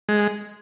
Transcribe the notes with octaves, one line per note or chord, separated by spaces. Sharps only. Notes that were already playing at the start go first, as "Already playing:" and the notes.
G#3